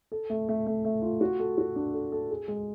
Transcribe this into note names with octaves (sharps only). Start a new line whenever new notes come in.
A4
A3
A3
A3
A3
F4
F#4
A4
F#4
D4
A4
A4
G#4
G#3